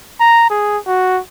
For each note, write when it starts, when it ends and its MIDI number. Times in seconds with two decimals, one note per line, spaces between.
0.20 0.46 82
0.50 0.78 68
0.87 1.19 66